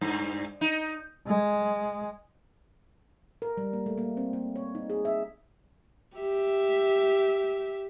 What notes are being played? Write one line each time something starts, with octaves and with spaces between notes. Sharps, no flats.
G2
D#4
G#3
A#4
G3
A#3
A3
A#3
C4
A#3
C#5
D#4
G#4
E5
G4 E5